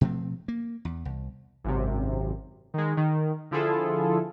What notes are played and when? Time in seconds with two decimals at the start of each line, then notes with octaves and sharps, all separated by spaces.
0.01 B2 F3 A3 C4
0.48 A#3
0.85 E2
1.05 C2
1.64 G#1 F#2 C3
2.74 D#3 G#3
2.97 D#3
3.51 D3 F3 E4 F4 G#4 A4